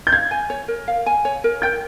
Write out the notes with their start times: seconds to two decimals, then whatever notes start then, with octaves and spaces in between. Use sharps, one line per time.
0.07 G6
0.12 F5 G#6
0.31 G#5
0.50 C#5
0.68 A#4
0.88 F5
1.06 G#5
1.25 C#5
1.44 A#4
1.62 G5 G6